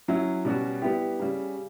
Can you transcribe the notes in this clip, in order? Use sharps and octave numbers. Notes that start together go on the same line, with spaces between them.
F#3 C#4 E4
B2 G3 C#4 F#4
G3 B3 E4 G4
C#3 G3 C#4